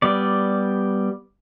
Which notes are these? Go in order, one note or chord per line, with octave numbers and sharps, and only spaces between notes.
G3 B3 D5